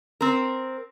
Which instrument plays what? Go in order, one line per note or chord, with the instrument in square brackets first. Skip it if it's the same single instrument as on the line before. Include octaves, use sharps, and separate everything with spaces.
[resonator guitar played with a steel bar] C4 A#4